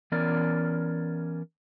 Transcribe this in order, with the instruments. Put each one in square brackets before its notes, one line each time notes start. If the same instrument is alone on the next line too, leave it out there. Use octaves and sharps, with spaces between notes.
[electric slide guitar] E3 B3 C#4 A#4 D5